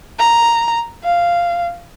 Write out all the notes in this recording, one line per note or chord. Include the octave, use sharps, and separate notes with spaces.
A#5
F5